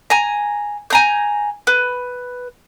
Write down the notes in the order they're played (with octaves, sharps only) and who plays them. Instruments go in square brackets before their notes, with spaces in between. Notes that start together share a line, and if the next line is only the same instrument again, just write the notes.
[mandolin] G#5 A#5
G#5 A#5 G6
B4